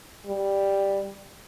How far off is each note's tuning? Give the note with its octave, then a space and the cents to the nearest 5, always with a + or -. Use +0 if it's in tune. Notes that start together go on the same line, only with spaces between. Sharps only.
G3 +5